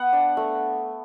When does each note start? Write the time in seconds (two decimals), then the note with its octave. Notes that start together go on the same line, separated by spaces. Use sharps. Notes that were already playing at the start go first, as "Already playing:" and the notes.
Already playing: B3 F#5
0.13 D4
0.37 A3